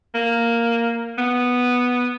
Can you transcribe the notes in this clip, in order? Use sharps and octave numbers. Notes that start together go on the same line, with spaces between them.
A#3
B3